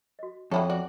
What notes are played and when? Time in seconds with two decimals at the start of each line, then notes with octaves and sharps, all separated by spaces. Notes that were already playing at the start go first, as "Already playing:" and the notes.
0.19 F#4 D#5
0.51 F2 F#3 E4 F4 A4 C#5
0.70 F#4 D5